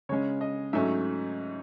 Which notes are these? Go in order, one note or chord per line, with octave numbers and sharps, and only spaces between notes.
C#3 G#3 C#4 C#5
D#5
G#2 F#3 A3 C#4 E5